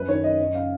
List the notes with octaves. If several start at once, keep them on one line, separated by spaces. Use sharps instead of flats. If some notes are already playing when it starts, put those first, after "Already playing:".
Already playing: F#2 B4
D#3 C#5
F#2 D#5
F#2 D#5
C#3 F5